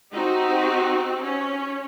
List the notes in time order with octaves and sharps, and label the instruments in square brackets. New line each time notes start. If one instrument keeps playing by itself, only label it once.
[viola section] C4 D#4 F#4 G4
C#4